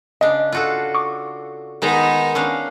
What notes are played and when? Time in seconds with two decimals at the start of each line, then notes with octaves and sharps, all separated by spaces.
0.21 C#3 D4 D#5
0.52 F4 F#4 A4
0.95 C#6 D6
1.82 D#3 G#3 B3 D#4 A#5
2.35 C#4 D4 F5